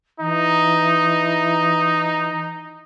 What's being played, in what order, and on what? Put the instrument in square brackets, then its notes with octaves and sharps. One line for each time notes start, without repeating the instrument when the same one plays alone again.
[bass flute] E3 [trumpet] D#4